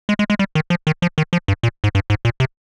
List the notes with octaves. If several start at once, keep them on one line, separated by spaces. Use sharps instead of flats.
G#3
G#3
G#3
G3
D#3
F3
D#3
F3
D#3
F3
G2
A#2
G#2
G2
G#2
A#2
C3